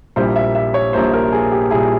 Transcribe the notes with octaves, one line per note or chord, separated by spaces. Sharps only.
A#1 A#2 G3 A#3 E4 C5
E5
E5
C#5
A#1 A#2 G3 A#3 E4 C5
A#4
G#4
G4
A#2 G3 A#3 E4 G#4